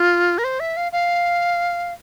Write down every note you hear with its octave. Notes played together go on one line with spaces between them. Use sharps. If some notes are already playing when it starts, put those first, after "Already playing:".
Already playing: F4
A#4
C5
E5
F5
F5